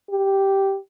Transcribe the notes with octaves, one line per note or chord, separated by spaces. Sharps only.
G4